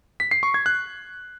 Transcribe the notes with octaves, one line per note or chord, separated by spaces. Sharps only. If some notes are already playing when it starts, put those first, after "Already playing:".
B6
C7
C#6
G#6
F#6